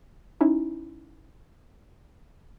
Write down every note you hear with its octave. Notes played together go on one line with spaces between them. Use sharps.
C#4 D#4 E4